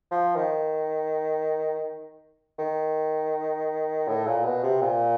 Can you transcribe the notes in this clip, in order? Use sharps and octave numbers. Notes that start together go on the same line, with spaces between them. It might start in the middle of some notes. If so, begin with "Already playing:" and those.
F3
D#3
D#3
A2
A#2
B2
C3
A#2